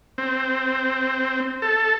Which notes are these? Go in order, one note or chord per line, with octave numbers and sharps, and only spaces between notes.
C4
A4